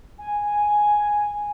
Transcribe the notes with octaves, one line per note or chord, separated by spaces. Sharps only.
G#5